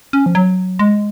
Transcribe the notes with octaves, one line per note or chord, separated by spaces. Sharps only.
C#4
F3
F#3
G#3